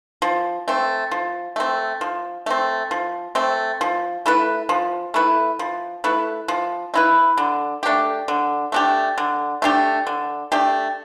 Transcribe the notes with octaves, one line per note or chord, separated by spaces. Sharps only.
F3
A3 C4
F3
A3 C4
F3
A3 C4
F3
A3 C4
F3
A3 E4 B4
F3
A3 E4 B4
F3
A3 E4 B4
F3
A3 E4 B4
D3
A3 D4 G4
D3
A3 D4 G4
D3
A3 D4 G4
D3
A3 D4 G4